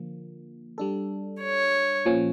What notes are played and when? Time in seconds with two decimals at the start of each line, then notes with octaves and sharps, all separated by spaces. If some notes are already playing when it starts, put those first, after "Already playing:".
Already playing: D3 F3 A#3
0.78 G3 D4 A4
1.42 C#5
2.06 A#2 F3 C#4